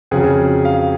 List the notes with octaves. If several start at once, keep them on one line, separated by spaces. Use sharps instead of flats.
F2 C#3 F#3 G#4
F5